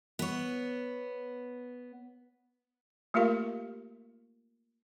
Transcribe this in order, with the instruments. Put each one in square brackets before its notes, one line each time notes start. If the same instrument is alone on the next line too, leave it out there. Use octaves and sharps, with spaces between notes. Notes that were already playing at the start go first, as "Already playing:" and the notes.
[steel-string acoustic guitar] B3 C#5
[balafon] A3 A#3 F4 G4 A#4 F5